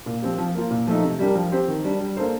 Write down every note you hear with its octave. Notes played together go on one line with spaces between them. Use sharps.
A#2
F3 C4 G4
F3
A#3 F4
A#2
F3 A3 D#4
C3
G3 D4 G4 A#4
F3
C4 G4 C5
D#3
G3 D4
G3
A#3 D4 A4 C5